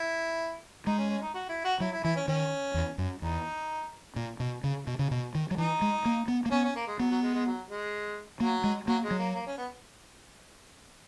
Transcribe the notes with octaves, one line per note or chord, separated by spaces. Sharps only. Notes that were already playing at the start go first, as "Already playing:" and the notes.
Already playing: E4
G#3 D#4
C#4
C#4
D#4
F#4
E4
F#4
F#3 E4
E4
E3 E4
C#4
D#3 C#4
E2
F#2
E2 D#4
A#2
B2
C#3
B2
C#3
B2
D#3
F#3
E3 D#4
G#3
A#3
B3
A#3
B3 C#4
C#4
A#3
G#3
F#3 B3
F#3
G#3
G#3
F#3
G#3
F#3 A#3
G#3
F#3 A#3
G#3
F#3
A#3
A#3
C#4
B3